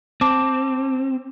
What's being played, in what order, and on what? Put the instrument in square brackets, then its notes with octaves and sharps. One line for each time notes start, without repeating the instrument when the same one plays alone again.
[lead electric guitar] C4 [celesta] A5 D6